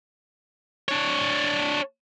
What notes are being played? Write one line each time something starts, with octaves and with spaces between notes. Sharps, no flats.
D4 C#5